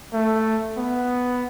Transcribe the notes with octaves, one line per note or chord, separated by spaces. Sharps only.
A3
B3